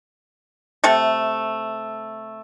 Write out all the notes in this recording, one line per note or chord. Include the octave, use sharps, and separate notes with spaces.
C3 A3 A4